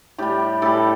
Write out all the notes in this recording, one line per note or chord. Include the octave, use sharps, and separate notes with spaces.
A2 G3 G4
A2 G3 A4